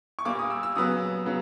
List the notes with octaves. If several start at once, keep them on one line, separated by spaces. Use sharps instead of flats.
C#6
A#2 G3 A#3 D6
D#6
E6
E6
C#3 F#3 B3 D#6
C#3 F#3 B3